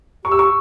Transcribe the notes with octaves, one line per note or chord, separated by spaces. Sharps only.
G4 C#6
E6
C#6